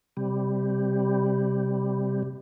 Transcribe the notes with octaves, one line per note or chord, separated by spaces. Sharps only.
C3 G3